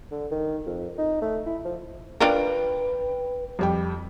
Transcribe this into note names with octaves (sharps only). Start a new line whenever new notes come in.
D3
D#3
F2
D#4
A3
E4
F3
D4 F4 A#4 B4 G5 D7
F2 G3 G5